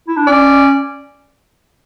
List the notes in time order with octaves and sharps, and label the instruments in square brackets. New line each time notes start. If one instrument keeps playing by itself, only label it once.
[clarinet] E4
D4
[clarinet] C#4 [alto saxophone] D5